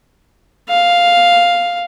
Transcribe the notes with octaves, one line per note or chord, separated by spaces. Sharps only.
F5